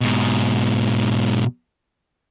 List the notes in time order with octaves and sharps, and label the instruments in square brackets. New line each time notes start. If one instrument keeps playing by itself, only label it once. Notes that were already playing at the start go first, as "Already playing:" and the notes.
[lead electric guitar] G#2 B2